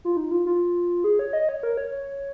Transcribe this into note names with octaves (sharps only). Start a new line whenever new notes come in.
F4
D#4
F4
F4
G#4
C#5
D#5
C#5
A#4
C#5
C#5